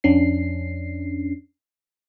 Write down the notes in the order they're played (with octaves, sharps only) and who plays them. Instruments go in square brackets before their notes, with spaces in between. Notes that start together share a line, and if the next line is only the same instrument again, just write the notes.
[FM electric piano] F2 C#4 D4 C7